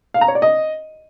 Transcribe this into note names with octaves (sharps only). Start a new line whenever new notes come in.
F5
A#5
C#5
D5
D#5